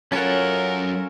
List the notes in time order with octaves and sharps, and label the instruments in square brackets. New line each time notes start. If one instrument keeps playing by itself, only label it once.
[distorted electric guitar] F#2 F#5 [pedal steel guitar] C#4 F4 A4 [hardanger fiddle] A#4 [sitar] C#5